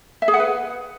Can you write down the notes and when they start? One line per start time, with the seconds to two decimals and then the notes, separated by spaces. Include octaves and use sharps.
0.22 E5
0.28 G#4
0.34 F#5
0.40 B4